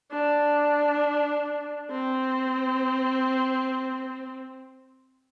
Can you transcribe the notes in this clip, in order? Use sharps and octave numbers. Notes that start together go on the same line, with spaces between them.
D4
C4